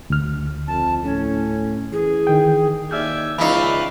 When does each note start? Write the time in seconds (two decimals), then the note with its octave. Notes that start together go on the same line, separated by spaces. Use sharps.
0.10 D2 F6
0.68 F2 A5
1.04 A2 C#4
1.93 E3 G#4
2.27 D#3 G5
2.91 D#2 D5 E5 G#5 E6 F6 G6
3.38 C#2 E3 D#4 D5 F5 B5 C#6 A6